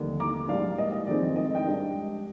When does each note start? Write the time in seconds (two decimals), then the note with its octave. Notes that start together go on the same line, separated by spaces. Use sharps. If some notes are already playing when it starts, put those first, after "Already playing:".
Already playing: F1 D#2 D3 G3 D4
0.20 A#5 D6
0.48 A#1 G#2 G3 D5 F5
0.78 D#5
0.92 D#5
1.07 F1 F2 D#3 G#3 C4 D5
1.36 D#5
1.55 D#5 G5
1.65 G#2 G3 D4